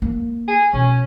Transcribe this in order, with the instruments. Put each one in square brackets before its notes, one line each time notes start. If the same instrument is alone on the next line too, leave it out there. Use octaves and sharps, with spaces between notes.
[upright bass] A#3
[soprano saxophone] G#4
[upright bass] B2 [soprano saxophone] C#4